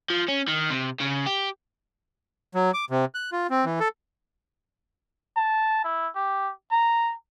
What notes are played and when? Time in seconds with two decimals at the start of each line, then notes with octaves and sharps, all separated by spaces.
0.10 F3
0.28 C#4
0.48 D#3
0.70 C3
1.01 C#3
1.27 G4
2.55 F#3
2.74 D6
2.90 C3
3.15 F#6
3.32 F4
3.50 C4
3.65 E3
3.80 A4
5.37 A5
5.85 E4
6.15 G4
6.71 A#5